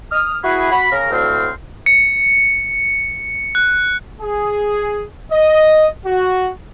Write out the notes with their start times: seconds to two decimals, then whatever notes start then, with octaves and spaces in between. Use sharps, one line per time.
0.11 D#6 F6
0.44 E4 F#4 G#4 B4
0.71 F#4 B5
0.92 C#3 A#4
1.10 D2 A2 C4 F5
1.86 C#7
3.55 F#6
4.21 G#4
5.32 D#5
6.06 F#4